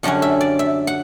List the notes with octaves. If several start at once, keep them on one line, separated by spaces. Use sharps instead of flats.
F#2 D3 G3 C#4 F#5
E5
D5
E5
F#5